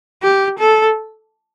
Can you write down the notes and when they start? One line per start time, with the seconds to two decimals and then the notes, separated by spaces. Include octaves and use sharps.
0.23 G4
0.59 A4